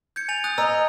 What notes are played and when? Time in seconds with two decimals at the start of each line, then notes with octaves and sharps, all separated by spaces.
0.16 G6 G#6 C#7
0.29 G#5 A6 F7
0.44 D#6 F#6 A6
0.58 D#5 A#5 E6